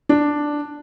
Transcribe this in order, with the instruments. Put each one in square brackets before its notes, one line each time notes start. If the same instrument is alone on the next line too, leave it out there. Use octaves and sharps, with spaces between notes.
[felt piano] D4